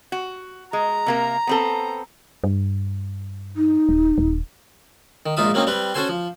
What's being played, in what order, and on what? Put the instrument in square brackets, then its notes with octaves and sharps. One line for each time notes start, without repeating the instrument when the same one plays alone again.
[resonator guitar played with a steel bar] F#4
[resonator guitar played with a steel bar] G#3 [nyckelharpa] A#5
[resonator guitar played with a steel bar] C3 A#3 A#4
B3 C4 A4
[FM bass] G2
[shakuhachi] D#4
[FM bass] D#1
D#1
[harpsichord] D#3
A#1 G#2 D#4 F4 E5 D#6
F#3 A#3 C4 C#4 D#4
G3 C4 B4
C#4 F#4 A4 C5 G#5 C6
F3